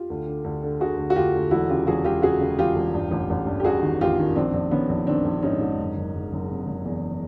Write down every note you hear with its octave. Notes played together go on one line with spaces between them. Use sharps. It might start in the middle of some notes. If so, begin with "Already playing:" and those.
Already playing: F4 G4
D2
D3
D2
D3
D3 F#4 G#4
D2
F#4
D2 F4 G4
D2
E1 E4 F#4
C#3 F4 G4
E1 F#4 G#4
E1 F4 G4
C#3 F#4 G#4
C#3
E1 F4 G4
E1
G2
A1
A1
G2
G4
G2 F#4 G#4
D#3
A1 F4 G4
D#3
A#1 C4 D4
A#1
D#3 B3 C#4
A#1
D#3 C4 D4
A#1
G#2 C#4 D#4
G#2
F#1
F#1
F#1
F#1
C3
F#1
E2